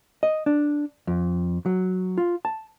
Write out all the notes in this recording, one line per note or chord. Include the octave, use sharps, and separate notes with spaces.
D#5
D4
F2
F#3
F4
A5